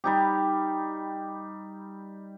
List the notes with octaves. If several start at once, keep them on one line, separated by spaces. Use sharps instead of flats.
G3 D#4 G4